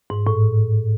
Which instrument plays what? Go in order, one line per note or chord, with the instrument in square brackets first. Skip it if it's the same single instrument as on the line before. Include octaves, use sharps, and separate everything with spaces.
[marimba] G#2
A2